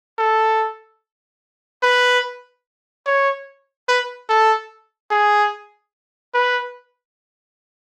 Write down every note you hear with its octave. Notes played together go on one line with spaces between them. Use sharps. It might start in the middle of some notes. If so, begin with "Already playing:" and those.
A4
B4
C#5
B4
A4
G#4
B4